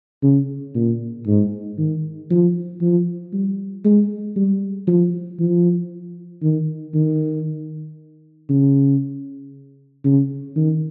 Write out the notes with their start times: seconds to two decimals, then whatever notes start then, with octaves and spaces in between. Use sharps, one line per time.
0.23 C#3
0.75 A#2
1.27 G#2
1.78 D#3
2.30 F3
2.82 F3
3.33 G3
3.85 G#3
4.36 G3
4.88 F3
5.40 F3
6.43 D#3
6.94 D#3
8.49 C#3
10.04 C#3
10.56 D#3